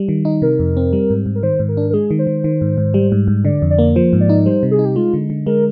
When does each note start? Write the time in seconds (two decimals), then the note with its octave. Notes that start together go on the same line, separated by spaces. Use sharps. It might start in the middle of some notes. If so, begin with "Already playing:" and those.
Already playing: G3
0.09 D#3
0.25 D#4
0.42 C3 A#4
0.59 F2
0.77 C4
0.93 G3
1.10 G#2
1.26 G#2
1.35 A#4
1.43 D#3 C5
1.60 G#2
1.69 A#4
1.77 D4
1.90 A#4
1.93 G#3 G#4
2.11 D#3
2.19 C5
2.27 D#3
2.44 D#3
2.61 G#2
2.78 G#2
2.94 G3
3.12 G#2
3.28 G#2
3.45 D3 D5
3.62 F2
3.70 D5
3.79 A#3
3.95 F3 C5
4.13 G#2
4.21 D5
4.29 D#4
4.46 G3 C5
4.63 C3
4.71 G#4
4.79 D#4
4.85 G4
4.96 G#3 F4
5.14 D3
5.30 D3
5.46 G#3 A#4